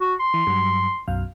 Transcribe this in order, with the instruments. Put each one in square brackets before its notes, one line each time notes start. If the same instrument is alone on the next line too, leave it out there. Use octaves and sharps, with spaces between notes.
[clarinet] F#4
C6
[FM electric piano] E3
G2 F#3
B1 F#2 F5